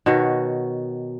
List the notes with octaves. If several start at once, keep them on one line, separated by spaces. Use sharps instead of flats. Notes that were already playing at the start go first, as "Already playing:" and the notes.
B2 D#3 F#4 C#5